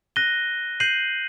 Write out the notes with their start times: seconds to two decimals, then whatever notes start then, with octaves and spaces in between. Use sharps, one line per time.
0.16 F#6 A#6 D#7 G7
0.80 G6 C7 D#7 F#7